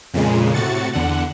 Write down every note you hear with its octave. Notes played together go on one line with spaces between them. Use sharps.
F2 A#2 C#3 G#3
A2 C3 F#4 A6 C#7
E2 D3 F#5